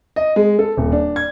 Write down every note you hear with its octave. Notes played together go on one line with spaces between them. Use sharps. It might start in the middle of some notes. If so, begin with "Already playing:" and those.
D#5
G#3
A4
D#1
D4
G#6